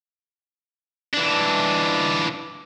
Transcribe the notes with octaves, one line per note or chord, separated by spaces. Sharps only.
E3 D4